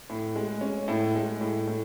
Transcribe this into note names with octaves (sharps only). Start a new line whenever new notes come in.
A2
G#3
C#4
A2
G#3
A2
A2